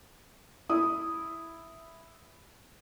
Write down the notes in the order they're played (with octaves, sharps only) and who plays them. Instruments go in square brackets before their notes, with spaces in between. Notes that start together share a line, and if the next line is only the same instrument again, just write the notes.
[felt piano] E4 D#6